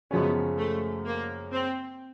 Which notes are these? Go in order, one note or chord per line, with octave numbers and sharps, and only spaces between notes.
F#2 C#3 F3 G#3 B3 C#4
A3
A#3
C4